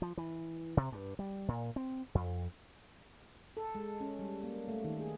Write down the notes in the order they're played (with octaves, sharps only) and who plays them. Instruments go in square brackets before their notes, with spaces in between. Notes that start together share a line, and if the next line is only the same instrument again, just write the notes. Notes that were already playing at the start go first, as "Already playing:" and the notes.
[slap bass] F3
E3
C3
G2
G3
A#2
C4
F2
[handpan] A4
G#3
C#4
G3
A#3
A3
D#3
G#4